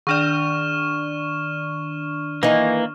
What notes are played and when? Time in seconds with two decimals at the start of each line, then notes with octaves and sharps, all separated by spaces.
0.07 D#3 D4 D5 C#6 F6 E7
2.43 E3 A#3 D#4